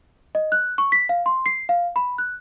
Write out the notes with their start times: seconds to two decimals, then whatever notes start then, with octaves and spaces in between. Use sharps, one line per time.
0.35 D#5
0.52 F#6
0.78 C#6
0.92 B6
1.09 F5
1.26 C6
1.46 C7
1.69 F5
1.96 B5
2.18 F#6